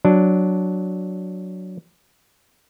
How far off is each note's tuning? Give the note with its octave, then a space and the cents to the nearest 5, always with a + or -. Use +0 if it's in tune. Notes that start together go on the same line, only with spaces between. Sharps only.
F#3 +0 D4 +0